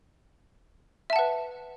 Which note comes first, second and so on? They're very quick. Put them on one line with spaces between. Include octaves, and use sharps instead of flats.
E5 A5 F#5 B4